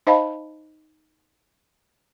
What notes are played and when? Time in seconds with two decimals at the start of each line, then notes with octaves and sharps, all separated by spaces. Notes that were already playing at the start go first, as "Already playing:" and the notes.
0.07 D#4 C5 D#5 F5 A5 B5